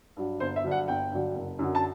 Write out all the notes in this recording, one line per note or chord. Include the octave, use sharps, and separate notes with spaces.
G2 F#3
G1 C5
E5
G2 D3 F#3
F#5
G1 G5
G2 D3 F#3
F#1
F#2 D3 F#3
A5